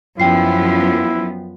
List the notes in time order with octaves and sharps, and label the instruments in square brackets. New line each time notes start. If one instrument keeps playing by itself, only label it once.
[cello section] F#2 F3 B3 [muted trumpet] E4 [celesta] G5 C7